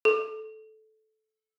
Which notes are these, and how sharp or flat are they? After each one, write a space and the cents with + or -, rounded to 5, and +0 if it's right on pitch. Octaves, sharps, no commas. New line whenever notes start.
A4 -10